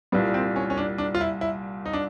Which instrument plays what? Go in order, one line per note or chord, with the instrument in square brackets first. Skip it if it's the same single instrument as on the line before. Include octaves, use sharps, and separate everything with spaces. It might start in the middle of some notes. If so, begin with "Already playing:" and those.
[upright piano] C2 A#2 G3 [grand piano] B3
[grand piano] C4
C#4
C#4
D4
D4
F4
E4
E4
D#4
D4